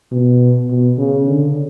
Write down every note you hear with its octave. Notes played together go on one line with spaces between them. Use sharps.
B2
B2
C#3
D3